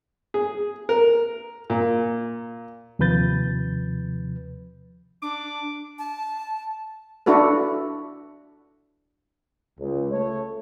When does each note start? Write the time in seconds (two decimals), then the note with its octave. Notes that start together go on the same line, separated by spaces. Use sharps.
0.34 G#4
0.89 A#4
1.70 A#2
2.99 D#2 C3 F3 B4 G6 A6
5.22 D4 D6
5.99 A5
7.26 D4 E4 F#4 A4 B4
9.80 C#2
10.11 A3 C#5